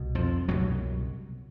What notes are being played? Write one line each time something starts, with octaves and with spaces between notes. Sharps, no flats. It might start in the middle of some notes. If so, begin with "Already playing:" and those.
Already playing: C2 B2
F2 F3
C2 F#2 B2 F#3